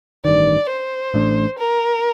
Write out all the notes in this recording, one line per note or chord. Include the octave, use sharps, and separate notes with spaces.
A1 G2 D#3 D5
C5
A1 A2 A3 D4
A#4